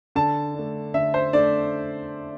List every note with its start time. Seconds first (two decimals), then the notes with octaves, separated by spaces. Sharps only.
0.15 D3 A5
0.54 A3 D4
0.94 D3 E5
1.14 C5
1.33 A3 D4 D5